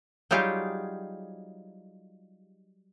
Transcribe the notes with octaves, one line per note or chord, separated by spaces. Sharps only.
F#3 G3 D#4 F4 G4 G#4